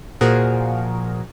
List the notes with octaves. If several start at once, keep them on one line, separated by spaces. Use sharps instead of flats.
A#2 F3 F#4 G#4 A#4